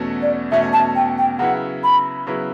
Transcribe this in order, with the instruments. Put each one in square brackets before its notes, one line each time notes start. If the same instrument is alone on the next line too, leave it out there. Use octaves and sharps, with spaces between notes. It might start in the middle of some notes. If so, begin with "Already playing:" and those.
Already playing: [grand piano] E2 B2 A3 C#4 F#4
[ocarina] D5
[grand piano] E2 B2 A3 C#4 F#4 [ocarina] E5
[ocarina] A5
G5
G5
[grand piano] C#3 F#3 B3 E4 [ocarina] F#5
[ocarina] B5
[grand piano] C#3 F#3 B3 E4